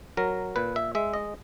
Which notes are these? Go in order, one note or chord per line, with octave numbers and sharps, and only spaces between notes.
F#3 A#4
A#2 B4
E5
G#3 E5
D#5